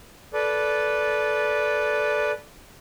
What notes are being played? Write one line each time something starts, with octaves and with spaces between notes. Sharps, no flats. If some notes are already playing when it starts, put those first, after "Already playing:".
A4 B4 D5